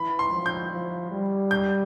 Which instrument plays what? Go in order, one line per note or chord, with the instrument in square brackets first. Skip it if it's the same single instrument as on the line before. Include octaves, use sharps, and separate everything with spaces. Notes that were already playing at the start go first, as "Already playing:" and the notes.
Already playing: [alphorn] E3 [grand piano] B5
[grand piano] C6
[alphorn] F3
[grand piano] G6
[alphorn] F3
G3
[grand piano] G6